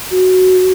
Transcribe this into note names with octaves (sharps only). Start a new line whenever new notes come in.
F#4